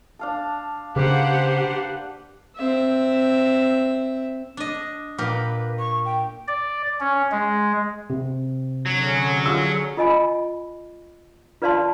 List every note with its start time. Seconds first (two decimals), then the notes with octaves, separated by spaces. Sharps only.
0.19 D4 F5 A5
0.96 C#3 A#3 D4 G4 B4 C5 F#5
2.56 C4 E5
4.57 D4 D#5
5.18 A#2 G4 A#4 B4
5.79 C#6
6.05 G5
6.48 D5
7.00 C#4
7.32 G#3
8.10 C3
8.86 D3 F#3 C#4 G#4
9.46 E6
9.97 F4 D#5 G#5 B5
11.62 F4 B4 D5 F5 A5 C6